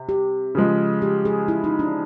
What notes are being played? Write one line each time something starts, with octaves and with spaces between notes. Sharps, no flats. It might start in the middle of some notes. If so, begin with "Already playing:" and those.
Already playing: C3
G4
C#3 F3 G#3
G4
G#4
E4
D#4
D4